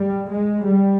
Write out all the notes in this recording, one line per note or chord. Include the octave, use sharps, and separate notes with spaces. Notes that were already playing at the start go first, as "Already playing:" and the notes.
Already playing: G3
G#3
G3